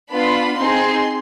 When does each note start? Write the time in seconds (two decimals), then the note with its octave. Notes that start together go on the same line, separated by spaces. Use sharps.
0.11 B3 D4 F4 B5
0.57 C4 D#4 G#4 C6